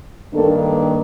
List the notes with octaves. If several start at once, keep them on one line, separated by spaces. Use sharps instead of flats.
G2 D#3 A#3 D4 A4